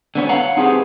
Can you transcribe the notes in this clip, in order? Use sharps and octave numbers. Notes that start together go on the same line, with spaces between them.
D3 B3 C#4
C#5 F5 F#5 A#5
C4 D#4 G4 G#4 B4